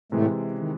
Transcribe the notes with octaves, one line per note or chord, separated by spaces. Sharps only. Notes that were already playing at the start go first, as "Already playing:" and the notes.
A2 C3 E3 G#3 A3
C#3
D#3